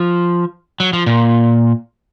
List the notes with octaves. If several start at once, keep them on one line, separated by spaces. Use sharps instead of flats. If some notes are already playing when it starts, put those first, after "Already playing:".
Already playing: F3
F#3
F3
A#2